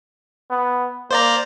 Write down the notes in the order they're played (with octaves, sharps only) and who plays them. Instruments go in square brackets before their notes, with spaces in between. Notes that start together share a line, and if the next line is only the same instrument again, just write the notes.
[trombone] B3
[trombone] A#3 [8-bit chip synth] C5 D5 A#5